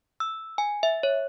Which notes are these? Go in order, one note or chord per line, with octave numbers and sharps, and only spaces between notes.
E6
G#5
E5
C#5